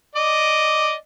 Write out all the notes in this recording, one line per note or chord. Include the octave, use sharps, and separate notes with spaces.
D5 D#5